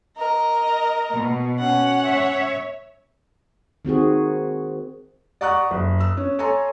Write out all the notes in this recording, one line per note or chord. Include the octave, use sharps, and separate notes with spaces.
A#4 D#5
B2
C#4 F#5
C#5 E5
D#3 C4 F#4 G#4
D5 F#5 A#5 C#6 D#6 F#6
F#1
E6
C#4
A4 C#5 G#5 A#5 C6